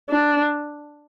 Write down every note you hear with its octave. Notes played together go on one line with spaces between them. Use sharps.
D4